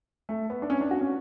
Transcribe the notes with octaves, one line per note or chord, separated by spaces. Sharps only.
A3
B3
D4
C#4
D4
F#4
C#4